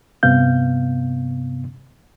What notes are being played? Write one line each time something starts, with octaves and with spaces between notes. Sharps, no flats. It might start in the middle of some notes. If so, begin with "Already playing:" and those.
G2 C3 B3 F5 G6